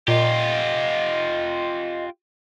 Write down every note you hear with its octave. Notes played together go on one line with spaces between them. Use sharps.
A#2 F4 G4 D#5